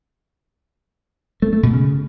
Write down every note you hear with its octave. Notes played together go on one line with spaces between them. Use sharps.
A3
A3
B2
C#3